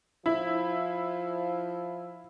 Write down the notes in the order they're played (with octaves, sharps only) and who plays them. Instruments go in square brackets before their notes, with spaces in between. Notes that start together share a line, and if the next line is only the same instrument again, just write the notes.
[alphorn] F3 [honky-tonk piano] E4